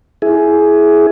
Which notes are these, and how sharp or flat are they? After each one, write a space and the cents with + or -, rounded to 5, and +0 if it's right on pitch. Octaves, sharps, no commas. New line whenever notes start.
E4 +0 G#4 +15